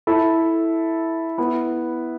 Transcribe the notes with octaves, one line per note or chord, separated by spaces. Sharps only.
E4 A4
B3 E4